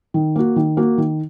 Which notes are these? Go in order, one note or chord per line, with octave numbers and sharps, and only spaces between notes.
D#3
A#3 F#4
D#3
A#3 F#4
D#3